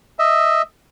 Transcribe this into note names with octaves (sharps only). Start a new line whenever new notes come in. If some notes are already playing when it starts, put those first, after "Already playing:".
D#5 E5